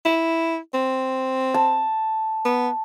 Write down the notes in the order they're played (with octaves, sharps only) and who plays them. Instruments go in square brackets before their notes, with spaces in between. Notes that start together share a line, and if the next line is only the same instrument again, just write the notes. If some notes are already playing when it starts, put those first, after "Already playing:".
[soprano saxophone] E4
C4
[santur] A5
[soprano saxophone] B3